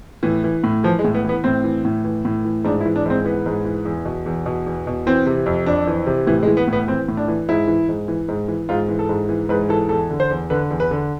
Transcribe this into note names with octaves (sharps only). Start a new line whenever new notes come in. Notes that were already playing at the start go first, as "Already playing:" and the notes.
A2 E3
E3
A2
E3 F3
G#3
A2
B3
E3 B3
A2 C4
E3
A2
E3
A2
E3
G#2 D4
E4
E3
D4
G#2 C4
E3 B3
G#2
E3
E2
B2
E2
B2
E2
B2
E3 C4
C3
F2
F2 D4
E3
C3
A2 E3
G#3
E3
B3
A2
B3
E3 C4
A2
D4
E3
G#2 E4
E3
G#2
E3
G#2
E3
G#2 F4
E3
A4
G#2
E3
G#2 B4
E3 A4
E2 A4
D3
C5
E2
D3 B4
E2
B4
D3